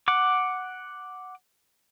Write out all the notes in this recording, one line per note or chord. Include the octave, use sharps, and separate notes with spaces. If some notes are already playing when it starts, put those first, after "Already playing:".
F#5 D6